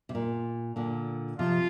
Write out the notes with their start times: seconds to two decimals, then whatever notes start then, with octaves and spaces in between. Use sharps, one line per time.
0.09 C3
0.15 A#2
0.76 A#2 D3
1.39 C3 F3 F4